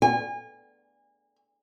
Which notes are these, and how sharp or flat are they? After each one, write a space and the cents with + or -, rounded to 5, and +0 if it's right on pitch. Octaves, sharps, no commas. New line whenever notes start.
G#5 -30